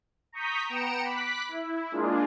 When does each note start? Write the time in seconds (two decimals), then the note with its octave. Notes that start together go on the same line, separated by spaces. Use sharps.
0.32 A#5 C#6 D#6 G6 B6
0.67 B3 G5 A#5 C#7 D7 E7
1.03 B5 D6 F#6 B6
1.48 E4
1.92 G#3 A#3 D4 F4 G#4